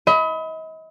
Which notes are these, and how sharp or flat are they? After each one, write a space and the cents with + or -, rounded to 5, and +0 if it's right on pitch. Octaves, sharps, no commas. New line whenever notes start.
D#5 +40 B5 +15